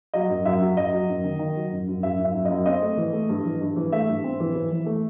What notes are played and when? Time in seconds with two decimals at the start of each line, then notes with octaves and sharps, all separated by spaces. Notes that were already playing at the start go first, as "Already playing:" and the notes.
0.14 F#3 D#5
0.29 F#2
0.45 F#2 E5
0.61 F#3
0.77 F#2 D#5
0.93 F#3
1.09 F#2
1.24 D#3
1.39 D#3
1.55 F#3
1.72 F#2
1.88 F#2
2.03 F#2 E5
2.19 F#2
2.25 E5
2.34 F#2
2.45 D#5
2.50 F#2
2.66 C4 D#5
2.82 A3
2.97 E3
3.13 A3
3.29 G2
3.45 E3
3.61 G2
3.76 E3
3.92 A3 E5
4.09 G2
4.24 C4
4.40 E3
4.55 E3
4.71 E3
4.86 A3